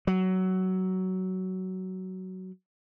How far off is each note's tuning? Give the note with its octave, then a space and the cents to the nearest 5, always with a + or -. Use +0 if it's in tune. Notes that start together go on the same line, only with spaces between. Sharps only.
F#3 +15